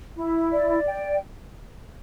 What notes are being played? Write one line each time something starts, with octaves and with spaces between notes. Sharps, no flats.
E4
D5
G5